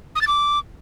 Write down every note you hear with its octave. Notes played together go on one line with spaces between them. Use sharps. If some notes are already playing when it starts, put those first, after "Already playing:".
D#6
A6
D6